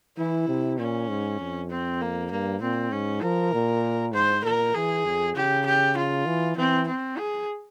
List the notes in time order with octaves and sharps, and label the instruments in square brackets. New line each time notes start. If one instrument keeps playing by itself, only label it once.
[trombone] E3 [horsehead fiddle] E4
[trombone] C3
[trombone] A#2 [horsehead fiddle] C#4
[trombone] G#2
F2
[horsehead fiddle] C4
A#3
[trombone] G2 [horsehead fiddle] A#3
[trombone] A#2 [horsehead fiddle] C4
[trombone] G#2 [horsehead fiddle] C#4
[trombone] F3 [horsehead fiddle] A#4
[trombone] A#2
[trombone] G#2 [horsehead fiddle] C5
[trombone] A#2 [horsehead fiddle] A#4
[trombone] E3 [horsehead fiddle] G#4
[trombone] F2
[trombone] C#3 [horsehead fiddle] G4
[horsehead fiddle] G4
F4
[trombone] E3
[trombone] E3 [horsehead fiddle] C4
[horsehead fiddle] C4
G#4